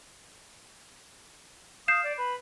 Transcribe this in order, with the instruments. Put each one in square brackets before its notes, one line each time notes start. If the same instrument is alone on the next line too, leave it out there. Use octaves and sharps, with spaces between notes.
[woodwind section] F5 D#6 [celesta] G6 C7 E7
[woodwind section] D5
B4 B5